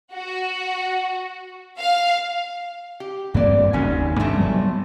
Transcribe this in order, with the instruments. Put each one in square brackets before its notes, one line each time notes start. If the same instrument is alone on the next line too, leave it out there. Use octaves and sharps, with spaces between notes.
[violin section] F#4
F5
[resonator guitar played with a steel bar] G4
[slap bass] G2 A#3 C4 [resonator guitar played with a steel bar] E3 D5
[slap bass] F#1 D#2 D#3 [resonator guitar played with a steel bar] F#3 C#4 G#5
[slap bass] G2 D4 [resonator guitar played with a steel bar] C3 A3
[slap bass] F#3 G3 B3